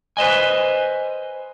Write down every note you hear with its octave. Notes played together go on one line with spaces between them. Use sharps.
B4 C5 D#5 G#5